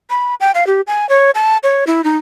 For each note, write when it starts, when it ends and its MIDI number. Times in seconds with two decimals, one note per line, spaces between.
0.10 0.35 83
0.40 0.51 79
0.55 0.66 77
0.67 0.81 67
0.87 1.08 80
1.09 1.31 73
1.35 1.57 81
1.63 1.84 73
1.87 2.04 64
2.04 2.17 63